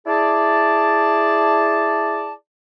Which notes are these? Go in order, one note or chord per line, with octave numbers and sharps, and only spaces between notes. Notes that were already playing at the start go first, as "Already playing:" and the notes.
E4 G#4 D5 A5